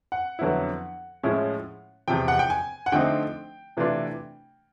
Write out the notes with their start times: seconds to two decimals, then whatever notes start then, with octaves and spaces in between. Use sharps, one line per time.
0.12 F#5
0.39 F2 D3 F#3 B3 E4
1.23 A2 F3 G#3 C#4 E4
2.08 E2 C3 F3 G5
2.28 F#5
2.39 G5
2.50 G#5
2.86 F#5
2.92 D3 F3 A3 C4 D#4 G5
3.77 C3 E3 A3 D4 F4